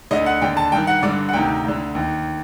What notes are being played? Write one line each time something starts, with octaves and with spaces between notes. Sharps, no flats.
D2 D3 D#5
F#5
D#2 D3 G5
A5
G2 D#3 G5
F#5
G2 D3 D5
F#5
D2 C3 D#3 G5
D2 D3
D#2 D#3